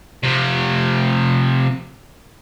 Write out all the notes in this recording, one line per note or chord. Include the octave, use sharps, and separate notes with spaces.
C3 F3